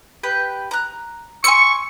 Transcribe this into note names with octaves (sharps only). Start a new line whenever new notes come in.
G4 B4 G5
A#5 F#6
G#5 C6 C#6 E6 C#7